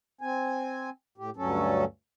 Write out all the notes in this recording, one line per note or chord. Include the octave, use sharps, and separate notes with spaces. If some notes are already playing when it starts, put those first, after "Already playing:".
C4 G#5
A2 G4
D2 G2 F#3 C#4 A4